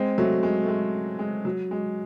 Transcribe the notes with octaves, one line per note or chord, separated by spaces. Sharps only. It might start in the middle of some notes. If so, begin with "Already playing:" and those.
Already playing: G#3 C4
F#3 A3
G#3
A3
G#3
G#3
F#3
G#3